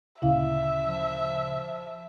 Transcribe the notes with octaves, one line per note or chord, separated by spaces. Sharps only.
D2 A#2 C#3 E4 E5 F5
F3